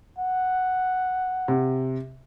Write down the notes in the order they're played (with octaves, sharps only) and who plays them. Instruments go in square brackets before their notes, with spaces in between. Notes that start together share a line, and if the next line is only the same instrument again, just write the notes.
[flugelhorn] F#5
[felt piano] C3